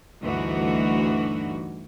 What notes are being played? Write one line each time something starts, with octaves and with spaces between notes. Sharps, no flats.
D2 G2 E3 D#4 F#4